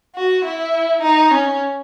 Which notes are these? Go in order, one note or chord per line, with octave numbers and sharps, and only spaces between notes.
F#4
E4
D#4
C#4